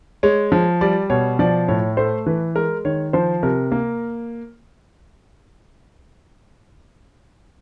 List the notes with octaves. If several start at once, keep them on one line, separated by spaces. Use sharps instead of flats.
G#3 C#5
F3
G3 D5
B2 C#5
F3 D5
A2 C#5
A3 C5
E3 B4
G#3 A#4
D#3 C#5
F3 C5
C3 A#4
A#3